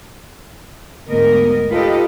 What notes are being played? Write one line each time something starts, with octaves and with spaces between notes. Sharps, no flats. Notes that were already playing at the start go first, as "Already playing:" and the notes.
D2 G#2 B3 A#4 D#5
D#4 F4 G4 A4 B4 D#5